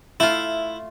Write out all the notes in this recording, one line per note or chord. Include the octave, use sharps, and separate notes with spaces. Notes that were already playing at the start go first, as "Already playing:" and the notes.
A3 E4 F4